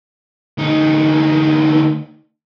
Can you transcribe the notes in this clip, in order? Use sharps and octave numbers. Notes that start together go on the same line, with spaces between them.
D2 D#4